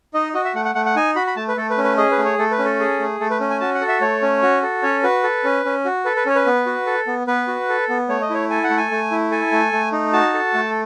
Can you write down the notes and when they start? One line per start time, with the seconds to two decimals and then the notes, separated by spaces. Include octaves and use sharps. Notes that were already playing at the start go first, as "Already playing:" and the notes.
0.14 D#4 D#5
0.34 F#4 D#5
0.45 E5
0.55 A3 F#5
0.65 F#5
0.75 A3 F#5
0.85 F#5
0.96 D#4 G#5
1.15 F#4 B5
1.27 B5
1.36 A3 A5
1.48 B4
1.57 A3 A4
1.70 B4
1.78 C#4
1.84 B4
1.97 G#4 D#5
2.11 B4
2.18 A3
2.25 C#5
2.38 A3 A4
2.51 B4
2.59 C#4
2.65 A4
2.80 G#4
2.99 A3
3.20 A3 A4
3.30 B4
3.40 C#4
3.50 G#5
3.60 F#4 A5
3.74 F#5
3.81 A4
3.88 E5
4.01 A3 C#5
4.22 C#4
4.42 F#4
4.63 A4
4.83 C#4 C#5
5.03 F#4 B4
5.24 A4
5.44 C#4
5.65 C#4
5.85 F#4
6.05 A4 B4
6.16 B4
6.26 C#4 C#5
6.36 B4
6.46 B3
6.66 F#4
6.86 A4
7.07 B3
7.27 B3 B4
7.48 F#4
7.69 A4
7.89 B3
8.09 A3 C#5
8.21 D#5
8.30 E4 C#5
8.50 A4 G#5
8.64 F#5
8.70 A3
8.77 G#5
8.91 A3
9.11 E4
9.31 A4 G#5
9.52 A3
9.73 A3
9.92 D#4
10.13 F#4 A5
10.34 A4
10.54 A3